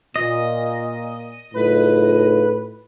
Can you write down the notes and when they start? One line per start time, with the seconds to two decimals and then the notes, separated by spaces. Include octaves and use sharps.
0.16 A#2 D#5
1.54 F#1 A2 D#4 F4 B4